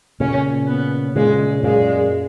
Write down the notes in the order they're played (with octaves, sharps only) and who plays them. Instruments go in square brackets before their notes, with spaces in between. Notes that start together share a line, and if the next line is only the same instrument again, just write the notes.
[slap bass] A#2 C#3 [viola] C#4
[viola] B3
[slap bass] A#2 C#3 [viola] G#3
[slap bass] F#2 A#2 [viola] G#3